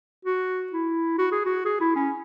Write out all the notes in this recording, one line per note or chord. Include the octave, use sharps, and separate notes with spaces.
F#4
E4
F#4
G#4
F#4
G#4
E4
C#4